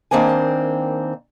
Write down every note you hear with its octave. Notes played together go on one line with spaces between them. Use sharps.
D#3 A#3 C4 D4 G#5